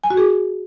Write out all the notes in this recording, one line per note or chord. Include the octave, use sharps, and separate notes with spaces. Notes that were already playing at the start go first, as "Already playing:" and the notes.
G#5
F#4
G#4